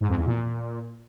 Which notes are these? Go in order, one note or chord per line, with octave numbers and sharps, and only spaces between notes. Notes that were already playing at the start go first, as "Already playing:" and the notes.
G#2
F2
E2
A#2